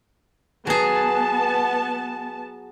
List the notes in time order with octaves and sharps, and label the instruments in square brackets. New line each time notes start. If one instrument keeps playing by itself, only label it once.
[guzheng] F#3 G#4 [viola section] B3 A5